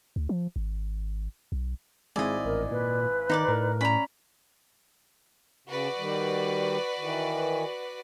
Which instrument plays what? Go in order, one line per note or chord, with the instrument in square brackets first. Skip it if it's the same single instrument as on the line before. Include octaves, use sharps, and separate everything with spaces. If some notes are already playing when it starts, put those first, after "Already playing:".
[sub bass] D2
F3
G#1
B1
[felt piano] G#1 E4 G#5 [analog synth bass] G#3 [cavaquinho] D5 D#5
[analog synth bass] A1 [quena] A#4
[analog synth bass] A#2 [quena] B4
[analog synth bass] D#3 [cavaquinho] D#4 D5 D6
[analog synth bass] A2 [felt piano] A#4
[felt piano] C#4 D5 [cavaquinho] A#5 B5
[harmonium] C#3 [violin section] F#4 B4 D5
[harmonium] D#3 G3
D#3 E3